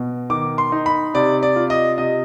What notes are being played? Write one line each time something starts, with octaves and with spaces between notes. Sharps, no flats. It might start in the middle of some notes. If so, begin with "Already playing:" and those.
Already playing: B2
D#3 D6
C6
D#4
B5
C3 D5
D5
F4
D#5
C3 D#5